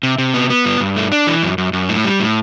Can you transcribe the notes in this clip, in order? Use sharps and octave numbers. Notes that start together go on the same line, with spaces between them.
C3
C3
B3
B3
G2
G2
A3
D4
E3
F#2
F#2
F#2
A2
G3
A2